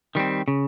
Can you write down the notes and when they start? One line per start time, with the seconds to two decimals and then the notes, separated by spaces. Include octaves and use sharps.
0.15 D#3 G3 C4
0.48 C#3